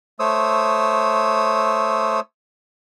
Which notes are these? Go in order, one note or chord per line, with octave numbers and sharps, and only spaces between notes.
A3 C5 C#5 D#6 E6